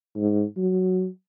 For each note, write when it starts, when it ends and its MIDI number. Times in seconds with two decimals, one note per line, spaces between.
0.16 0.44 44
0.57 1.07 54